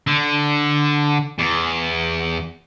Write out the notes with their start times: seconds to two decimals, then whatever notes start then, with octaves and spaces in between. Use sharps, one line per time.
0.07 D3
1.39 E2